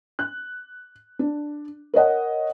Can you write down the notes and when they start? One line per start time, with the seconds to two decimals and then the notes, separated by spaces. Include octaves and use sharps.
0.19 F#6
1.19 D4
1.94 A#4 C#5 D#5 F#5